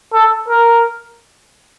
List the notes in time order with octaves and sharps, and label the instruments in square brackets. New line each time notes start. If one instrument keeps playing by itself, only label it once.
[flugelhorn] A4
A#4